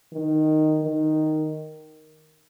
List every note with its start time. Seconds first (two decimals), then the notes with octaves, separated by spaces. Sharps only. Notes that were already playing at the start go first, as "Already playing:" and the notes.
0.13 D#3
0.82 D#3